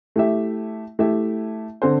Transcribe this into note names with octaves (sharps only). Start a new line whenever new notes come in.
A3 E4 G4 E5
A3 E4 G4 E5
D3 C4 A4 C5